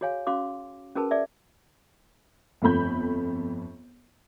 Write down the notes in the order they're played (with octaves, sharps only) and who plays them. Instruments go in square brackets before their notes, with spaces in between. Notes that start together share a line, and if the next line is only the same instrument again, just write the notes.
[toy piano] F#4 G#4 C#5 F5 G#5
C#4 F#4 F5 C6 D6
C#4 F#4 G#4 A#4 B4 A5
G#4 D5 E5
[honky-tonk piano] G1 F2 A3 B5 G6